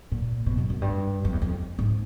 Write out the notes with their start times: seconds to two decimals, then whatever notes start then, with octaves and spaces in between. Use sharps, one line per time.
0.12 A#2
0.46 B2
0.58 F#2
0.70 F#2
0.82 G2
1.25 F2
1.32 E2
1.42 F2
1.79 G#2